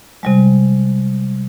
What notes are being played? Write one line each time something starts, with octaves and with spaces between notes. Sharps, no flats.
C3 G3 G#3